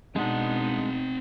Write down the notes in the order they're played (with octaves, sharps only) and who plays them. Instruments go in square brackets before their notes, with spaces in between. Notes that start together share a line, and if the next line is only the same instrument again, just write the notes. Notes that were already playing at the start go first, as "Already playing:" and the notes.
[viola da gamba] B2 D#4 [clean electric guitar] G#3 D4 [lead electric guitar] C4 F#5